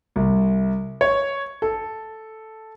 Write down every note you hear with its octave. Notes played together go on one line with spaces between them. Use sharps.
C2
C#5
A4